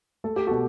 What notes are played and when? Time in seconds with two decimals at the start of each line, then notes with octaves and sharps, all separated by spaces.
0.24 A3 A4
0.36 G4
0.47 B2 F#4 A4